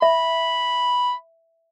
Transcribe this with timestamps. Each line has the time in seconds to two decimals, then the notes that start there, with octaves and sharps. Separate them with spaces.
0.02 E5 B5